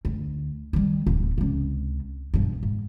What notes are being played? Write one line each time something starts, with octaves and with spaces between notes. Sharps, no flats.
D2
D#3 G3
D1 B3
C#2 C3
G2 B2
G#2